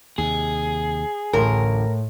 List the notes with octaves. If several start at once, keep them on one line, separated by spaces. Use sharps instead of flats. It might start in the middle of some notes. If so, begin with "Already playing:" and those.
D#2 C3 G#4
A1 D2 A2 D3 A#4 C6